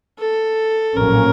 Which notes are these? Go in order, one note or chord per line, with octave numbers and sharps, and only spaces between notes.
A4
A#1 A2 F#3 A#3 C#4 A#4